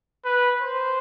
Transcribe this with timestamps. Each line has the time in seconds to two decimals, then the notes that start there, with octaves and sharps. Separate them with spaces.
0.25 B4
0.61 C5